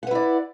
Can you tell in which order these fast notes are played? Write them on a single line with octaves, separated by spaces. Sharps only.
F#5 B4 E4 D5